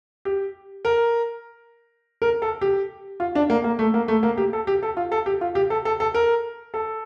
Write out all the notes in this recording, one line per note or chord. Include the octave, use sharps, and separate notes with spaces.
G4
A#4
A#4
A4
G4
F4
D4
A#3
A#3
A3
A#3
A3
A#3
G4
A4
G4
A4
F4
A4
G4
F4
G4
A4
A4
A4
A#4
A4